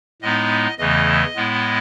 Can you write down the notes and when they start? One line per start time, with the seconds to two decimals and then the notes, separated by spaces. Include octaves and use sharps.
0.22 A2 G#3 B3 D#4 D#5
0.78 E2 C#3 E3 A3 D#5
1.36 A2 G#3 B3 E4